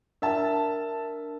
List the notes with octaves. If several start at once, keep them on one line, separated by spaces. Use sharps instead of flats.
D4 A#4 E5 A5 E6